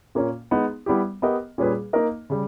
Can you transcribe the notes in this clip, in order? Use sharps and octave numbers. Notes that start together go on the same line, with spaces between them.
A#2 A#3 C#4
G#3 B3 D#4
G3 B3 E4 G4
B3 G4 A#4 D#5
A#2 G3 C#4 G#4 B4
A#3 D#4 A#4 D#5
C#3 G3